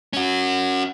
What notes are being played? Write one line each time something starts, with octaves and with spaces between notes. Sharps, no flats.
C#4 F#4